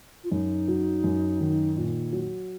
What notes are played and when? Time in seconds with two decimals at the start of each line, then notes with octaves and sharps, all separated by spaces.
0.24 F4
0.32 F#2 D#4
0.68 F#3
1.04 F#2
1.40 D#3
1.76 A#2
2.13 F#3